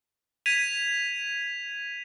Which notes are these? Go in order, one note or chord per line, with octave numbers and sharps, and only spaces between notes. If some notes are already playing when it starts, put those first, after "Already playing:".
G#6 B6 D#7 F7